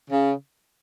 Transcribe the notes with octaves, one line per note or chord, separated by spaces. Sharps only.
C#3